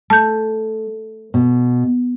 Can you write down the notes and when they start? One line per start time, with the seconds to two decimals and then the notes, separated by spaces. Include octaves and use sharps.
0.10 A3 A5 G6
1.34 B2